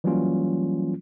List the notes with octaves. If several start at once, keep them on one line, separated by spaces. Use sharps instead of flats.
E3 F#3 G3 A#3 C#4 F4